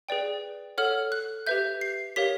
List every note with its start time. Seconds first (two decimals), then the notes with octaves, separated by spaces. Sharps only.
0.09 G#4 B4 D5 G5
0.78 A4 C#5 F#5 F6
1.12 F#6
1.47 G4 B4 E5 G6
1.81 C7
2.16 G4 A#4 C#5 F5 B6